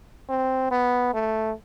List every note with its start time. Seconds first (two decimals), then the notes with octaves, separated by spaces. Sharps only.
0.29 C4
0.71 B3
1.14 A3